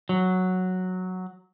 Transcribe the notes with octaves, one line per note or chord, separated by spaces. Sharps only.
F#3